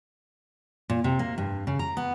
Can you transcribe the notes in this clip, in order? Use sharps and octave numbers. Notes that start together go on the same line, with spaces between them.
A#2
C3
A#3
G2
C#3
A#5
B3